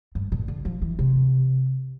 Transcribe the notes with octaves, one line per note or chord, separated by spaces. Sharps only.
G2
A#2
D3
F3
E3
C3